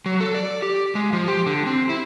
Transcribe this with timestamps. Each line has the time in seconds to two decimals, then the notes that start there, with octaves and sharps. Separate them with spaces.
0.06 F#3
0.20 A4
0.34 D5
0.62 G4
0.95 G#3
1.13 F3
1.28 G4
1.46 D3
1.66 C4
1.89 E4